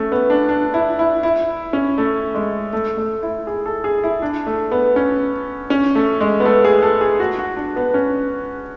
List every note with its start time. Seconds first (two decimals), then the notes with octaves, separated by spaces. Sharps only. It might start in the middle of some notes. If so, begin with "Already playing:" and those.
Already playing: A3 C#4
0.12 B3
0.30 D4
0.49 D4
0.74 E4
0.99 E4
1.23 E4
1.73 C#4
1.98 A3
2.35 G#3
2.73 A3
2.97 A3
3.23 E4
3.47 G#4
3.66 A4
3.84 G#4
4.04 E4
4.22 D4
4.47 A3
4.71 B3
4.96 C#4
5.70 C#4
5.95 A3
6.21 G#3
6.40 B3
6.45 A3
6.65 G#4
6.83 A4
7.01 G#4
7.20 F#4
7.39 F#4
7.57 D4
7.76 B3
7.94 C#4